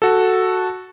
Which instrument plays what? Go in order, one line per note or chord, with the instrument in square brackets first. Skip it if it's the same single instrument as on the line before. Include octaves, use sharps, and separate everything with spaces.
[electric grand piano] F#4 A4